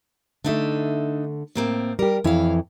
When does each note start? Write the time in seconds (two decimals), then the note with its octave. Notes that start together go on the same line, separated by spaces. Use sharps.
0.44 D3 A3 D4 D#4 E5
1.55 A2 A#3 C4
1.99 G3 G4 A#4
2.24 F2 E3 E4 C#5 F5